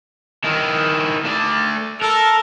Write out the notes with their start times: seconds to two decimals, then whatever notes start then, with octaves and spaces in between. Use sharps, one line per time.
0.44 D#3 E4
1.25 A3 D5
2.02 A4 A#4 A5